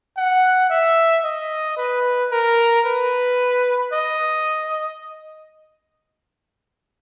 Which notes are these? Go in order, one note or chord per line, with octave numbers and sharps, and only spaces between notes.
F#5
E5
D#5
B4
A#4
B4
D#5